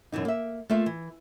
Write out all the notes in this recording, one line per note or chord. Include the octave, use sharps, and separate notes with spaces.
F#2 B2 E3 D#4
A#3 E5
A3 A#3 F4 E5
E3